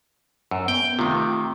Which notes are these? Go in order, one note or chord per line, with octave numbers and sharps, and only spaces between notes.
F#2 E6
B3 G5
C3 D#3 A3 F4